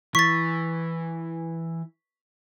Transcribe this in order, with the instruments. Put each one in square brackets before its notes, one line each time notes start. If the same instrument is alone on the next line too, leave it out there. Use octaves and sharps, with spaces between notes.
[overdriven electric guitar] E3 [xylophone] C#6 A6 [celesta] B6